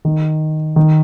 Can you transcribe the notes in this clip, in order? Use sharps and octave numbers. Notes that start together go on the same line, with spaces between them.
D#3
D#3